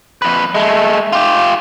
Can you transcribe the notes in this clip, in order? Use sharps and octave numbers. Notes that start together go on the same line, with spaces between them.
F2 B4
G#3 A3
F4 G4